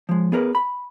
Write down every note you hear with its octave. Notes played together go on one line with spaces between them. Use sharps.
F3 G#3
B3 G#4 A#4 B4
B5